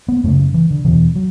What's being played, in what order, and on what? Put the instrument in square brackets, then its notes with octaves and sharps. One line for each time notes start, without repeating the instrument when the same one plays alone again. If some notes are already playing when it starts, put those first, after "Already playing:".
[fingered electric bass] B3
F#2 C#3 A3
E3
D3
E2 B2 E3
F#3